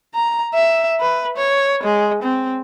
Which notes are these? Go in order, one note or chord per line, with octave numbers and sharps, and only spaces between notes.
A#5
E5
B4
C#5
G#3
C4